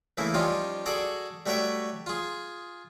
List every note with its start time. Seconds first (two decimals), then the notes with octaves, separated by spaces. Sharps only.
0.17 C#3 E3 A3 A#3 E4
0.34 F3 G3 C#4 D#4 F4 G4
0.86 F#4 G#4 A4 D5 F#5
1.46 G3 A3 F#4 C#5 E5 G5
2.06 F4 G#4